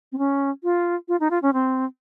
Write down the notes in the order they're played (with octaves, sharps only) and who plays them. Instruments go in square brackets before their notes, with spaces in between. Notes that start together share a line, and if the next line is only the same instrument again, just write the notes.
[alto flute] C4
C#4
F4
F4
D#4
F4
C#4
C4